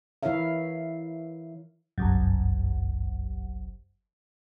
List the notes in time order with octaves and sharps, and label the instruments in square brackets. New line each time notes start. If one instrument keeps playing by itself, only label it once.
[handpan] E3 E4 A#4 C#5 E5 F5
[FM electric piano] G1 C2 F#2